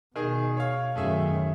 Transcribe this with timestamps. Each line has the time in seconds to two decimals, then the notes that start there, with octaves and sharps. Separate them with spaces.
0.16 B2 D#3 G#4
0.57 C#5 F5
0.95 F#2 D#3 A3 G#4 E5